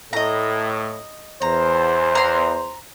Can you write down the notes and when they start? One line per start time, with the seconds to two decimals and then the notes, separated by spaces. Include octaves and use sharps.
0.13 A2 D#5 A#5
1.42 E2 C5 A#5
2.15 A#5 C6